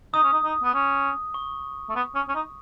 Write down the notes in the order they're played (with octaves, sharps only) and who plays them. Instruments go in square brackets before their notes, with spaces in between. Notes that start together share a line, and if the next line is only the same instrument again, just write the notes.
[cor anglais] D#4 [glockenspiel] D#6
[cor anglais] C#4
D#4
D#4
B3
C#4
[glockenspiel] C#6
[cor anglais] A3
B3
C#4
C#4
D#4